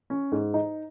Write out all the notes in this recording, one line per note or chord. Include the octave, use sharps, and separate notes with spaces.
C#4
G#2
D#4